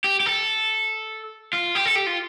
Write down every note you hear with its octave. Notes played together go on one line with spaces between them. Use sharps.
G4
G4
A4
F4
G4
A4
G4
F4